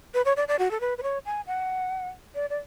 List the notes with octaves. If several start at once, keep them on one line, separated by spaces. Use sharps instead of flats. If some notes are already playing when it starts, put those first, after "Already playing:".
B4
C#5
D5
D5
F#4
A4
B4
B4
C#5
G#5
F#5
D5
D5